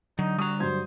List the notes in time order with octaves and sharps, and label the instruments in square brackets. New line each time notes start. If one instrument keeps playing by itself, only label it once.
[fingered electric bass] D3 [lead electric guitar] F#3 [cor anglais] D#4
[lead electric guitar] G3 A#5 [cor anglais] F#4 [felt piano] D#6
[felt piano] G2 F#3 G#6 [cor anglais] C5